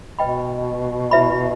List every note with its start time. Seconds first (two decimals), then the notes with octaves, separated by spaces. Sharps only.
0.19 B2 B4 D#5 G5 B5
1.11 E4 B4 E5 B5